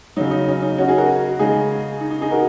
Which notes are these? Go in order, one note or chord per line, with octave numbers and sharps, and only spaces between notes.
C#3 F#3 D#4
D#4
C#4
D#4
C#4 F#4
D#4 G#4
F#4 A#4
C#3 G#3 D#4 G#4
D#4
D#4
D#4 G#4
F#4 A#4